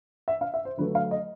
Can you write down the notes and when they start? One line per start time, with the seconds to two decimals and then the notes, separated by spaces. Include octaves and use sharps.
0.28 E5
0.41 F5
0.54 E5
0.65 C5
0.77 D3 F#3 A3 B4
0.95 F5
1.11 D#5